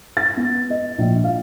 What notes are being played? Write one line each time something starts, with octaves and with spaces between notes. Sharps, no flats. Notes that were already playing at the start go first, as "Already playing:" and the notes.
A6
B3
D#5
A#1
F5